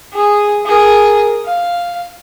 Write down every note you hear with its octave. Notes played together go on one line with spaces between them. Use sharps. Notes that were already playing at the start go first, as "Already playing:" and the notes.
G#4
G#4 A#4
F5